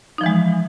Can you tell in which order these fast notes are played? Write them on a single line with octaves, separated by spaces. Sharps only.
D#4 F3 E3 G#3